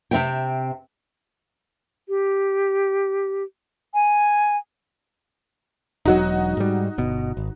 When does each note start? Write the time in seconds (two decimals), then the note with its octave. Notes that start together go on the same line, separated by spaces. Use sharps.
0.11 C3 A3 C4 E5 G5
2.09 G4
3.94 G#5
6.05 E1 F#3 D#4 F#4
6.57 G#2 G3
6.98 G1 B2
7.37 G#1